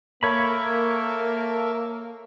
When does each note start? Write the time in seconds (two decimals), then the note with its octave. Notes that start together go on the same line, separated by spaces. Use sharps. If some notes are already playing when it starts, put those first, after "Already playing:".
0.23 A#3 A4 A#4 C#5 E5 B5